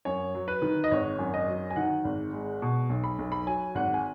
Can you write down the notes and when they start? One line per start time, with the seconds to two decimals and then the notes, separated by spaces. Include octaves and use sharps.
0.05 F#2 C#5
0.35 F#3
0.48 B4
0.62 D#3
0.84 D#5
0.91 G#1 C#5
1.19 F#2
1.34 D#5
1.48 F#3
1.71 G#5
1.76 D#3 F#5
2.05 G#1
2.33 G#3
2.62 B2
2.90 B1
3.04 B5
3.19 B1
3.32 B5
3.47 F#3 G#5
3.75 G#1 F#5
3.94 G#5